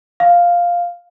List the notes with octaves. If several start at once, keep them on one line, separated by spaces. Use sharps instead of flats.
F5